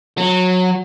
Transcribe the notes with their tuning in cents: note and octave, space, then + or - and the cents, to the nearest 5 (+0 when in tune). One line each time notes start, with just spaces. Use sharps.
F#3 -20